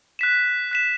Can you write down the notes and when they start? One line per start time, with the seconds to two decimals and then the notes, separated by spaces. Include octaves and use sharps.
0.19 F#6 B6 E7
0.71 F#6 B6 E7